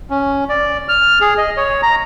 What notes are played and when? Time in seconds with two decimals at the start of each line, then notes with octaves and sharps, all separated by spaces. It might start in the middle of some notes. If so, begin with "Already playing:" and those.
0.10 C#4
0.49 D5
0.89 F6
1.21 G#4
1.38 D#5
1.57 C#5
1.83 A#5